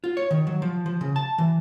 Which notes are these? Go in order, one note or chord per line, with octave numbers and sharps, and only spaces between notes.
F4
C#5
D#3
F#3
F3
F3
C#3
A5
E3